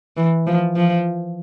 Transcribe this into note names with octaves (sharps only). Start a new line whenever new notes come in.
E3
F3
F3